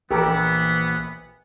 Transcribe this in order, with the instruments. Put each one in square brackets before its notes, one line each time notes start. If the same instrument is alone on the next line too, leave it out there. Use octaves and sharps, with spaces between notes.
[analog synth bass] A#1 [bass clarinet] E3 [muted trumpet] B3 [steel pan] G4 A4 A#4